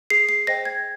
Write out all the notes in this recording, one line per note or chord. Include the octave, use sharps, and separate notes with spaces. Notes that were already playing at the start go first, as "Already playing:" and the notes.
G#4 C7
C7
C5 D#5 G5 A#6
G#6